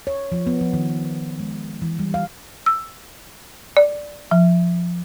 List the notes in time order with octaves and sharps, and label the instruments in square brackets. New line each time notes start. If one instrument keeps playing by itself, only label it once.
[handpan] C#5
F3
B3
F3
D#3
G#3
E3
G3
F5
[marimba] E6
D5
F3